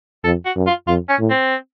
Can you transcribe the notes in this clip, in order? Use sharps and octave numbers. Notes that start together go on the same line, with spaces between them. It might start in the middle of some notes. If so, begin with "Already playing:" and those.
F2 A4
F#4
F#2
F4
F2 F4
C#4
A2
C4